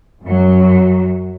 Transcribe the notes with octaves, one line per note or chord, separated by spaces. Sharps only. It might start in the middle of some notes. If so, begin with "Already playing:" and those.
F#2 F#3